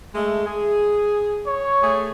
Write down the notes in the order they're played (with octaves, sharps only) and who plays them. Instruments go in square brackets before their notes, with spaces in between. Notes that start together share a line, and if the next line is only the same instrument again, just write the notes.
[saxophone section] G#3 A3
G#4
[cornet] C#5
[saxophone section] A3 G#4